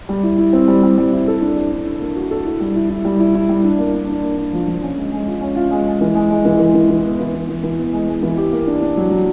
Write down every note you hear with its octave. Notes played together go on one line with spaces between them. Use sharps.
G3
E4
E4
C4
G3
G3
G3
E4
A4
D4
A4
D4
D4
A#3
F#4
A4
E4
G3
E4
E4
G3
E4
E4
G3
D4
A#3
D4
D4
A#3
D4
F3
F3
C#4
G#3
G#3
F4
C#4
F4
G#3
G#3
E3
G#3
G#3
E3
E3
E3
E3
B3
E3
E3
E3
E3
B3
G#3
G#3
E3
G4
A#3
D4
D4
F#3
F#3